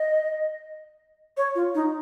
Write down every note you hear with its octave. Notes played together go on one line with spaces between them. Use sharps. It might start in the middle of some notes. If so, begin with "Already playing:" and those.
Already playing: D#5
C#5
F4
D#4